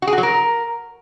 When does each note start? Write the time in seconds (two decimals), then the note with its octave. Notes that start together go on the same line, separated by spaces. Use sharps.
0.02 F#4
0.07 G#4
0.13 F#4
0.18 F#3
0.23 A#4